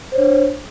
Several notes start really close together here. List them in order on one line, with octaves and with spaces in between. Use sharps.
C5 C#5 D4